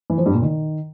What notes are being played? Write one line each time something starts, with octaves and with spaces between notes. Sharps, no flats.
E3
F3
G2
A#2
D#3